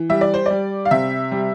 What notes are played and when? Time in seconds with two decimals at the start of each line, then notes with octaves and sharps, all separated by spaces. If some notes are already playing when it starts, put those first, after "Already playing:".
Already playing: E3
0.09 G3 E5
0.21 D5
0.34 C5
0.46 G3 D5
0.85 F5
0.91 C3 E5
1.32 G3